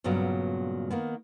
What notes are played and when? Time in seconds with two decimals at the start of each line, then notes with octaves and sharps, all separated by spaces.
0.04 G2 A#2 C#3 F#3 B3
0.91 D#3 A#3 B3